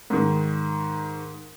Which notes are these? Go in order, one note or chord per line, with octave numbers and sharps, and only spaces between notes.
G#2 D#3